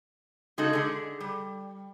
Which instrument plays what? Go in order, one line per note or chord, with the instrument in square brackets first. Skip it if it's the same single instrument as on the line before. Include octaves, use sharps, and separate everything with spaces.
[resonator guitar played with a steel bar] C#3 G#3 D#4 F#4 A4
D3 G#4
G3